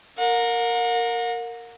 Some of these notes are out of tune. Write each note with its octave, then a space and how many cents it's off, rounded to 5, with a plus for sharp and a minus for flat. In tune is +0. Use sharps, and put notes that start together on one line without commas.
A#4 -10 F#5 -45